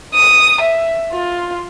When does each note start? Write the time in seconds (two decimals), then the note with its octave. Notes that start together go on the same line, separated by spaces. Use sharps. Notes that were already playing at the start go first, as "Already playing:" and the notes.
0.15 D#6
0.61 E5
1.13 F4